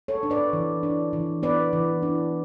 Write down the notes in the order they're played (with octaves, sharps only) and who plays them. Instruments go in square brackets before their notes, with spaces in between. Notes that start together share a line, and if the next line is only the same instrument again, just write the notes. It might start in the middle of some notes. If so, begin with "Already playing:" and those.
[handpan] A4 C#5
D4
B4 D5
E3
D4
E3
B3 B4 D5
E3
D4